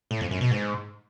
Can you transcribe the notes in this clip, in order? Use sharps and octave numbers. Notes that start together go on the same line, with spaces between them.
A2
F2
F#2
B2
G#2